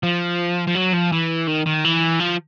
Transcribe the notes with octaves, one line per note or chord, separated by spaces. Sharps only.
F3
F3
F#3
F3
E3
D#3
D#3
E3
F3